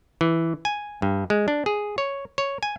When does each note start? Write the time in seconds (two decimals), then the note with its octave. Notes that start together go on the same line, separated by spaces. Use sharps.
0.21 E3
0.65 G#5
1.02 G2
1.30 G#3
1.48 D4
1.66 G#4
1.98 C#5
2.38 C#5
2.63 G#5